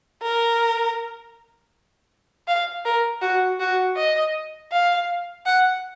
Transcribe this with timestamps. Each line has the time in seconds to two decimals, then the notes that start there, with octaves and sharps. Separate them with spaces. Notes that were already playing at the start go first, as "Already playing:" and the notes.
0.22 A#4
2.47 F5
2.85 A#4
3.22 F#4
3.60 F#4
3.96 D#5
4.72 F5
5.46 F#5